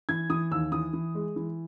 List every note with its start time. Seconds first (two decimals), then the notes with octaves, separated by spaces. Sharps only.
0.09 E3 G#6
0.30 E3 D#6
0.51 D#2 E6
0.72 E3 D#6
0.93 E3
1.15 G#3
1.36 E3